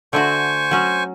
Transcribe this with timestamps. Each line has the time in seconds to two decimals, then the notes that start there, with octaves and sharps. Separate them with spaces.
0.13 D3 A3 F#4 C5 G#5 C#6
0.71 F#3 C#4 F#4